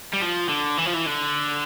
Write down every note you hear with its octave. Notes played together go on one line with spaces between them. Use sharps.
G3
F3
D3
E3
F3
E3
D3